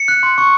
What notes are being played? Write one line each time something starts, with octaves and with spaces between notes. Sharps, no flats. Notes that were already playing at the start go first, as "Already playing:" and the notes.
Already playing: C#7
F#6
C6
C#6